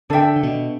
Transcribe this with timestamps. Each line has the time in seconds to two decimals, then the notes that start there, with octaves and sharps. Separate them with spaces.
0.10 D3 D4 A4 E5 G5
0.36 D3
0.43 B2